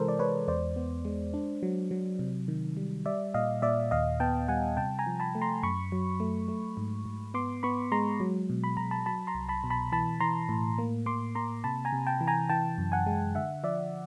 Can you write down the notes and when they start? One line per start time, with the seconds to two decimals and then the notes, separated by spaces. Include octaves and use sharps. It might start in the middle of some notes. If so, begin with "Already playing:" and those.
Already playing: C3 E3 G#3 A4 A#4 C5
0.08 D5
0.19 G#3 B4 C#5
0.48 E2 C5 D5
0.76 B3
1.05 G#3
1.34 D4
1.63 F#3
1.91 F#3
2.19 C3
2.48 D#3
2.77 G3
3.06 G3 D5 E5
3.34 A#2 D#5 F5
3.62 A#2 D5 E5
3.91 D#2 D#5 F5
4.20 B3 G5 A5
4.48 G3 F#5 G#5
4.77 C3 G5 A5
4.99 G#5 A#5
5.06 F3
5.20 A5 B5
5.35 A3
5.42 A#5 C6
5.63 F#2 B5 C#6
5.92 F#3
6.20 A3
6.48 A3
6.77 G#2
7.05 G#2
7.34 B3 C6 D6
7.63 B3 B5 C#6
7.92 G#3 A#5 C6
8.20 F#3
8.50 B2
8.64 B5
8.77 B2 A#5
8.91 A5 B5
9.06 F#3 A5 B5
9.27 A#5 C6
9.34 C2
9.49 A5 B5
9.64 B2
9.70 A5 B5
9.92 E3 A5 B5
10.20 E3 A#5 C6
10.49 A2
10.78 A#3
11.06 A#3 C6 D6
11.35 A#3 A#5 C6
11.64 C3 A5 B5
11.85 G#5 A#5
11.92 C3
12.07 G5 A5
12.21 E3
12.28 G#5 A#5
12.50 E3 G5 A5
12.78 F#2
12.92 F#5 G#5
13.07 G#3
13.35 D3 E5 F#5
13.63 F3 D5 E5